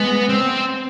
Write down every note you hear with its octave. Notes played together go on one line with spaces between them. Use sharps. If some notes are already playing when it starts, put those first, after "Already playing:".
Already playing: G#3 B3
C4